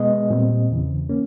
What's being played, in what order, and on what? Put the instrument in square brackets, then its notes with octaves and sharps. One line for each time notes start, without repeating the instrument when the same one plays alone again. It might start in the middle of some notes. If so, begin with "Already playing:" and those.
Already playing: [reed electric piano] B2 G#3 B3 D#5
A#2 G3 C4
E2 C#3 E3
A#3 C#4